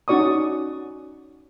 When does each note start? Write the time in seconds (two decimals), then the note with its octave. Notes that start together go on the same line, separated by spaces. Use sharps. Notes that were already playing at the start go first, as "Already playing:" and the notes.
0.08 C#4 D#4 F#4 D5 C#6 D#6